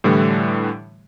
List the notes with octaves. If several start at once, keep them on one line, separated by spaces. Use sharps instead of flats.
A2 D3 E3 G3 A3